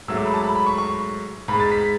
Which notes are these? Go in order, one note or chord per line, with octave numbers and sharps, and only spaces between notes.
G#2 F#3 A3 E6
D6
B5
A5
B5
B5
C#6
C#6
G#2 G#3 B5
A6
B6